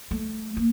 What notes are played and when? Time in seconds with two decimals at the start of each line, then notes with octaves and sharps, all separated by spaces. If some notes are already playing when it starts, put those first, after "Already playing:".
0.11 A3
0.57 A#3